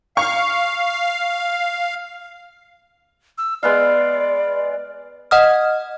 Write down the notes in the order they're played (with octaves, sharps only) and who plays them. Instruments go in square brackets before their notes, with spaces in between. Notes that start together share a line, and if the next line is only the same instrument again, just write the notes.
[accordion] F5 [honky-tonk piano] C#6
[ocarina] E6
[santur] G#3 B3 F5 [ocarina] D5
[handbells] D#5 F#5 D#6 F6